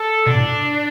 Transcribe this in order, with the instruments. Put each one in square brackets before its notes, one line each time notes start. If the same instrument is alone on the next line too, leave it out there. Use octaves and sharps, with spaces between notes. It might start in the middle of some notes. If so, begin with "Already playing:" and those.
Already playing: [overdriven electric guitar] A4
[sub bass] B2 [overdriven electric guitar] D4
[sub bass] A2